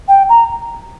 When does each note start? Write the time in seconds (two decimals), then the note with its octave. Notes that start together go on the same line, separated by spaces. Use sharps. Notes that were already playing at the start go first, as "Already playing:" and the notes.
0.08 G5
0.29 A#5